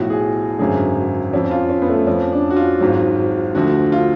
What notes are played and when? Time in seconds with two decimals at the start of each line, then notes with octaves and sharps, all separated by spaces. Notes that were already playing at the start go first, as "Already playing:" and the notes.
Already playing: B1 A2 F3 F#4
0.10 G#4
0.59 G#1 F#2 D3 F#3 G#4
1.33 F2 F3 C#4
1.51 F4
1.70 C#4
1.82 B3
1.89 A3
2.07 F2 F3 C#4
2.32 D4
2.50 F#4
2.56 F4
2.80 G#1 G#2 F#3
3.55 D2 D3 F3 F#4
3.92 F4